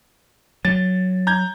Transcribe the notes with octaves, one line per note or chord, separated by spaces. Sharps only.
F#3 A6
A#5 G6 G#6